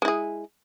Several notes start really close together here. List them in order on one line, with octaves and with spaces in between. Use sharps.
G#3 E4 G#4